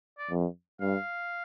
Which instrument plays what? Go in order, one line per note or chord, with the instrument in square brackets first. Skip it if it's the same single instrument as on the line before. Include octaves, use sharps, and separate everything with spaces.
[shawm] D5
[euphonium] F2
[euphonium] G2 [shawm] F5